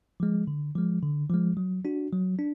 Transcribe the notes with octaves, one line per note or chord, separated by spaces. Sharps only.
F3 G#3
D3
F3 G#3
D3
F3 G#3
F#3
D4 F#4
F#3
D4